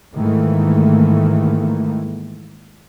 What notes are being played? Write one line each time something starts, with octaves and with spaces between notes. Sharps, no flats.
G#2 D#3 E3 A3 A#3